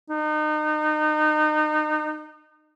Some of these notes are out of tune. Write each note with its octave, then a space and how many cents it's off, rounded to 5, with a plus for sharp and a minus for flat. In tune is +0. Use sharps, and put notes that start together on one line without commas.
D#4 -30